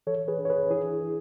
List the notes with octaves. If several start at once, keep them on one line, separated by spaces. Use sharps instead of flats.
E3 A4 C#5
G#4 B4
D4
C#5
G#4 B4
E3 E4 G#4